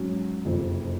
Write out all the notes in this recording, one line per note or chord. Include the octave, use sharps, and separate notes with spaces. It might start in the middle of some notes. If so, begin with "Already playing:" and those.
Already playing: G#2 F#3 C#4 F#4
F#1 F2 C3